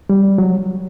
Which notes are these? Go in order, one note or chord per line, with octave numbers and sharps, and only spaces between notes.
G3
F#3